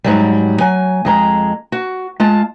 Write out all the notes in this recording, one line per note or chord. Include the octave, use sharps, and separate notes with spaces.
G#2 F#3 G3
F#3 G#5
F2 G#3 A#5
F#4
G#3 F4 A5